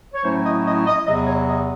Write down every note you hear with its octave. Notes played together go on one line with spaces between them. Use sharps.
C#5
A2 F#3 A3 C#4 E4 C5
D#5
D#5
D#5
E2 C3 F#3 D#5
C#5
D#5